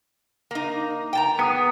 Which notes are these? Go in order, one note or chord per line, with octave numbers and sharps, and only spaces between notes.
A#3 D#4
G5 A5 A#5
B3 G#4 D#6